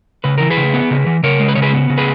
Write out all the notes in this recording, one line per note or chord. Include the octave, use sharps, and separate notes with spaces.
C#3 B4
E3 A#4
G#4 B4
C#3
B3
C#3
E3
C#3 A#4 C#5
G#3
B4
C#3 C#5
G#4 B4
B3
C#3
G#4 B4